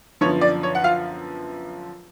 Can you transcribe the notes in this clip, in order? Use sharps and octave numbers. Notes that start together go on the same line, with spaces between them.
F#2 D3 F3 B3 C#5
D5
C#5
F#5
F4 F5